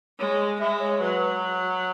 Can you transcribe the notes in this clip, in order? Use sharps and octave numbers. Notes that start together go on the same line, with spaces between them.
G#3 C#5
G#3 E5
C#5
F#3 B4